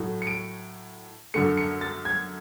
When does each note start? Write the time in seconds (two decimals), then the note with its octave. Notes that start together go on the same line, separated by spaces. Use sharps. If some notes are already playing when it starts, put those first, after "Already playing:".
Already playing: A2 F#3 A3
0.22 C#7
0.27 D7
1.34 F#2 D3 A3 C#7
1.57 C#7
1.81 A6
2.05 G#6